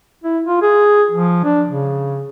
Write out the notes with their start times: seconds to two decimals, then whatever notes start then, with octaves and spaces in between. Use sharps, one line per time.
0.24 E4
0.46 F4
0.62 G#4
1.11 F3
1.44 D4
1.68 C#3